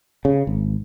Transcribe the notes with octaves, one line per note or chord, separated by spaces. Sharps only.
C#3
G#1